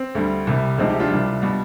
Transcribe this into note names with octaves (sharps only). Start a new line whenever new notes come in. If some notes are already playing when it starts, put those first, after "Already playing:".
Already playing: C4
D2 D3 G3
C2 C3 G3
D2 C3 F3 G#3 C4 D#4
D#4 G4
D4 F4
C2 C3 G3
B2 G3